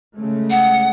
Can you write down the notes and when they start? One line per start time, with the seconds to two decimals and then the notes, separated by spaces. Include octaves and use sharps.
0.15 C#3 G#3 A3
0.50 F#5